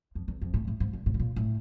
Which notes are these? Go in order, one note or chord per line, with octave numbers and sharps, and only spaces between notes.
F2
E2
F2
A2
A2
G#2
G2
A2
B2
A#2
A2